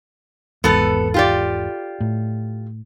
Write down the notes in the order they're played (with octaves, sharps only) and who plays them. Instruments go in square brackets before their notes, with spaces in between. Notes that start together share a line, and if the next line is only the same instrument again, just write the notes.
[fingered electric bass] G#1 E2 G#2 [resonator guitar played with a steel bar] B3 A4
[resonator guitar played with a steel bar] F4 G4 D5
[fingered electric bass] A2